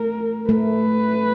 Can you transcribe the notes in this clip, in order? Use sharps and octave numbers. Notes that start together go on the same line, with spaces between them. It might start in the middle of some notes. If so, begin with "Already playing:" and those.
Already playing: A3 A#4
A3 B4